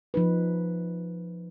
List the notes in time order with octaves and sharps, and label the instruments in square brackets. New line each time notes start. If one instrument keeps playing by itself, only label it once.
[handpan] F3 D#4 B4